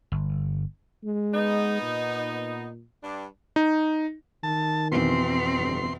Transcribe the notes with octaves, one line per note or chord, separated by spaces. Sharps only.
G1
G#3
B3 D#4
A#2
G2 D4
D#4
D#3 A5
F2 B2 E3 C4 C6
G1